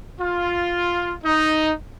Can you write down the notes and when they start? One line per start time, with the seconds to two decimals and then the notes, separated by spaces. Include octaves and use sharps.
0.20 F4
1.24 D#4